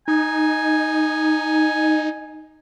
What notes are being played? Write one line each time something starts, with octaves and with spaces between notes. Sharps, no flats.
D#4 G#5